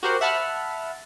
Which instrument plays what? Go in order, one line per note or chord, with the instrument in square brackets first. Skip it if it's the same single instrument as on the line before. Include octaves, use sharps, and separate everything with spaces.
[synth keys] F#4 G4 A#4 C5 F#5
E5 F#5 A5 B5 F6